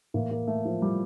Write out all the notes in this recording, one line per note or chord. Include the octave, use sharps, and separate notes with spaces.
A2 E3 A#3
A#3
A3
F3
G3